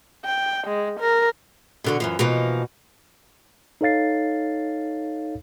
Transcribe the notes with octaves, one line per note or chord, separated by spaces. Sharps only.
G5
G#3
A#4
B2 D3 C#5
F#2 E3 F3
B2 E3 F3 A#3 D#4
D#4 A4 C#5 F5 A6 C7